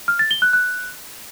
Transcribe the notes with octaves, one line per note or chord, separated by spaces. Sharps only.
F6
A6
G7
F#6
F#6